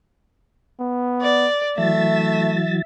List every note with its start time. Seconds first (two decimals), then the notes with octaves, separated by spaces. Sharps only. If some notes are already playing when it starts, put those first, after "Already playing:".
0.80 B3
1.22 D5
1.78 E3 F#3 A3 E5 A6